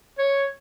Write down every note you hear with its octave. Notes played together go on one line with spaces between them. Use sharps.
C#5